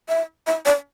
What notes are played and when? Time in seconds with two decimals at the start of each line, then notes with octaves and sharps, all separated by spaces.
0.09 E5
0.47 E5
0.66 D5